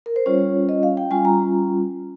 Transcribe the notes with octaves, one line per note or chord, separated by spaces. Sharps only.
A#4
C5
G3 C#4 F4 C#5
D#5
F5
G5
G3 C#4 F4 G#5
A#5